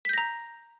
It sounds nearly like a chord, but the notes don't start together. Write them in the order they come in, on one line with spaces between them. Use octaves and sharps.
B6 G6 A#6 A#5